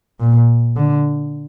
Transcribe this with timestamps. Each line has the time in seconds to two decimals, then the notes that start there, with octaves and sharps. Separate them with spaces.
0.20 A#2
0.76 D3